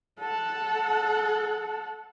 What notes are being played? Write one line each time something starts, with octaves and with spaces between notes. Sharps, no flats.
A4 F#5